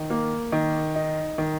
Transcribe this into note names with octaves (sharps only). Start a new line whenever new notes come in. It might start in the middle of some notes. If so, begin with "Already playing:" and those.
Already playing: D#3
A#3
D#3
D#4
D#3